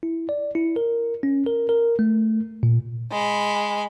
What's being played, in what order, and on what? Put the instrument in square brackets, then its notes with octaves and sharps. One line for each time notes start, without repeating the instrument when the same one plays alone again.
[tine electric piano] E4
D5
E4
A#4
C#4
A#4
A#4
A3
A#2
[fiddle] G#3 B5